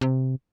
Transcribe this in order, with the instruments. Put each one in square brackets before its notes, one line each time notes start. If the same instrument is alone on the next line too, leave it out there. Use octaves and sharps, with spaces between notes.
[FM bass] C3